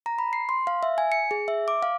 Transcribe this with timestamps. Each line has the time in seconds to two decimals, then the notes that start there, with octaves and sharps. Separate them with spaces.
0.06 A#5
0.19 B5
0.33 C7
0.49 C6
0.67 F5
0.83 E5
0.98 G#5
1.12 C#7
1.31 G#4
1.48 E5
1.68 D6
1.83 F5